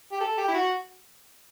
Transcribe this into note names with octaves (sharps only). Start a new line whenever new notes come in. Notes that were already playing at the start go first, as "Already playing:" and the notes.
G4
A4
G4
E4
F#4